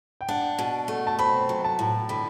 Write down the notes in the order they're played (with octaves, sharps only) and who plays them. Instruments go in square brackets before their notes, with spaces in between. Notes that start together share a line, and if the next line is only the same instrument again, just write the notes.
[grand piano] G5
[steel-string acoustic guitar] D4 [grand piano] F#5
[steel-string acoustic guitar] B2
A3
[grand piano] A5
[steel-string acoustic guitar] C4 [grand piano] B5
[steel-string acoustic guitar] F#3
[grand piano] A5
[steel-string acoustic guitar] A2
[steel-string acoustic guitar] D3 [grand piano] B5